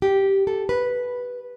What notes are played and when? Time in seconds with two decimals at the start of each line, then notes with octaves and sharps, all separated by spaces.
0.02 G4
0.47 A4
0.69 B4